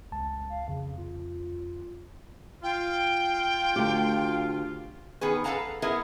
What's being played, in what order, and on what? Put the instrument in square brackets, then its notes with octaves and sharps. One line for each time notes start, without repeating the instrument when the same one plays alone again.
[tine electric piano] C#2 A5
[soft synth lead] F5
[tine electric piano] F2 [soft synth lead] C#3
[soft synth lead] F4
[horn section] F4 [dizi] G5
[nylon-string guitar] D2 G4
[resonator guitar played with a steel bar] D#3 B3 G#4 B4
A4 B4 F5 F#5 A5 A#5
B3 E4 G#4 A#4 B4 E5